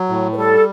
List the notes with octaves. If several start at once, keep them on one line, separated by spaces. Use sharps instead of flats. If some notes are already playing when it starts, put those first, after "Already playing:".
Already playing: F#3
A2
B4
G3 A4